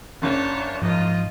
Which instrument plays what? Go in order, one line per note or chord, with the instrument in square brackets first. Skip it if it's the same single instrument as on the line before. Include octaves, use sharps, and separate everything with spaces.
[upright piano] F#1 F#2 [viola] D4 C#5
[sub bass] G#2 [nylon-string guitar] F3 [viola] F4 D#5